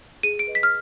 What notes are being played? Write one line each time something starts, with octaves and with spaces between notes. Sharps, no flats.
G#4 D#7
D7
B4 D#5
B6
F6